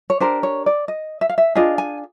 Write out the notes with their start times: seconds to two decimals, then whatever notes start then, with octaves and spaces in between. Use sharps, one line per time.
0.10 C#5
0.20 D4 G4 A#4 C5
0.43 C#5
0.66 D5
0.88 D#5
1.21 E5
1.29 F5
1.38 E5
1.55 D4 F4 G#4 D#5
1.78 G#5